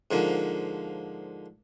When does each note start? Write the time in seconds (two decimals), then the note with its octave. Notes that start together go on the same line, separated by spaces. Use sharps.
0.11 G#2 D3 F3 A#3